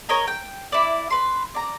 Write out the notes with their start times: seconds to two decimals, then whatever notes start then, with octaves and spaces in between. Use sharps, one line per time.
0.09 A#4 C#5 D#5 A#5
0.27 G5
0.72 E4 D5
1.10 B4 C6
1.55 D5 A#5